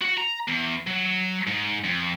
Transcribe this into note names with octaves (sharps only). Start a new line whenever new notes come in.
F#4 F#5
A#5
E2
F#3
G#2
F2